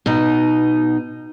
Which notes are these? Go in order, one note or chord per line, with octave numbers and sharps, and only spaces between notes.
B2 D#4